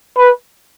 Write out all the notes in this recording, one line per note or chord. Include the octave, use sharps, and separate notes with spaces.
B4